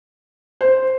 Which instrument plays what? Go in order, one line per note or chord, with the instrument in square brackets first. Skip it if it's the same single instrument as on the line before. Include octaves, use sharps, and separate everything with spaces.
[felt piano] C5